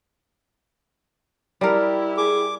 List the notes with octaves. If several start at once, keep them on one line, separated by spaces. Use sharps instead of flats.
G3 E4 G4 A#4
G#4 D6